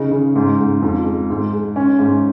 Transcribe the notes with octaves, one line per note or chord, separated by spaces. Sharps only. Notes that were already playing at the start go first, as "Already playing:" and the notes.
Already playing: C#3 D#4
C#3
G#2
G#2
F2
G#3
G#2
G#3
C#4
G#2